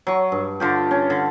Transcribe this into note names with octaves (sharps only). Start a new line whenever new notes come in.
F#3 C#6
G2
D3 F4 G4
C#4
D3